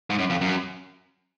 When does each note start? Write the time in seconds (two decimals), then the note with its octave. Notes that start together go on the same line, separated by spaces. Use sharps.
0.10 G#2
0.19 F#2
0.30 F2
0.41 F#2